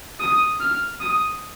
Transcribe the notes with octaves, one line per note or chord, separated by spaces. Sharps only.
D#6
F6
D#6